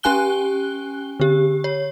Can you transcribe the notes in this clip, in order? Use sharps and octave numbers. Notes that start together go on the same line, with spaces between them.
C#4 G4 G#5 F#6 G7
D3 G4
C#5